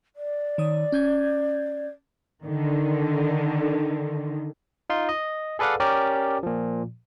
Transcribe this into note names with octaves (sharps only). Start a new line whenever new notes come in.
D5
D#3 C#5 D#6
C#4 G6 G#6
D3 D#3
D#4 F4 C6
D#5
G#4 A4 B4 D5 F5 F#5
C#4 G4 A#4 D5
A#2 F3